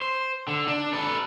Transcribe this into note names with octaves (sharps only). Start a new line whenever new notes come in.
C5
D3
D4
A4 B4